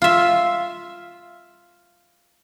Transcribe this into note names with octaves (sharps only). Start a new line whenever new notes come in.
F4 E5